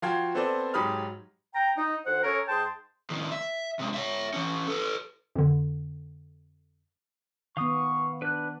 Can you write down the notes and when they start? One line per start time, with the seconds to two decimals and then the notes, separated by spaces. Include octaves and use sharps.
0.02 F3 F#4 F5 G5 C6 G#6
0.35 B3 C4 A4 C5 D5
0.74 G#2 F#3 G4 B5 D#6 F6
1.54 G5 A#5
1.76 D#4
2.05 D2 C5 F#5
2.23 C#4 A4 A#4 C#5
2.48 G#2 G#4 G5 A5 C6
3.10 A2 D#3
3.32 E5
3.79 C3 G#3
3.94 C#5 E5
4.34 E3 C#4
4.67 A4 B4
5.36 F2 D3
7.57 D#3 B3 F5 C#6 D#6
8.22 D4 B4 F#6